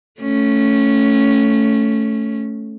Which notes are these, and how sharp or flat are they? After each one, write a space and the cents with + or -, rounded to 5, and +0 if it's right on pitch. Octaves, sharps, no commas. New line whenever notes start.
A3 +0 C#4 +0